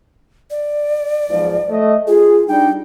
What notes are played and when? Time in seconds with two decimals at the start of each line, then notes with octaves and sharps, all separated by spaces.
0.50 D5
1.29 B1 G#2 F3
1.70 A3 D#5
2.08 F4 G#4
2.48 G3 D4 D#4 G5